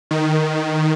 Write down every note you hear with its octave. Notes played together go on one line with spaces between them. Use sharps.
D#3